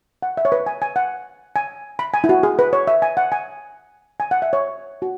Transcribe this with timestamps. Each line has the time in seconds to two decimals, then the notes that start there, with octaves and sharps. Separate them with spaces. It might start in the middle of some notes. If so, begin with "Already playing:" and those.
0.22 F#5
0.37 E5
0.45 C#5
0.52 B4
0.66 G#5
0.82 G#5
0.96 F#5
1.56 G#5
1.99 B5
2.14 G#5
2.24 E4
2.29 F#4
2.43 G#4
2.59 B4
2.73 C#5
2.87 E5
3.02 G#5
3.17 F#5
3.32 G#5
4.20 G#5
4.31 F#5
4.42 E5
4.53 C#5
5.02 F#4